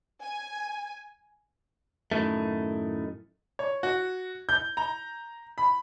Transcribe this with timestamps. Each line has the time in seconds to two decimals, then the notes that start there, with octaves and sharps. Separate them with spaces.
0.22 G#5
2.12 F#2 A2 C3 D#3 A3
3.59 C#5
3.83 F#4
4.49 G6
4.77 A#5
5.58 B5